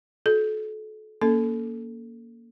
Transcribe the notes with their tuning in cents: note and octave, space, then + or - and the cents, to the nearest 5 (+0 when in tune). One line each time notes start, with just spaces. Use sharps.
F#4 -30 A4 -35
A#3 +0 C#4 +25 A4 +0